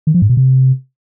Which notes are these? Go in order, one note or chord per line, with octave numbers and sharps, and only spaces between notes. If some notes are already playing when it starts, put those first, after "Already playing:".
D#3
F3
G#2
B2
C3